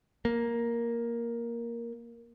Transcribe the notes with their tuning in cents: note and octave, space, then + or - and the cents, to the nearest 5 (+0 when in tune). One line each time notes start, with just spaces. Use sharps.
A#3 +5